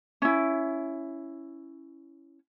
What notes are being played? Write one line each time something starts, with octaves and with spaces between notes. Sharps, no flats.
C#4 E4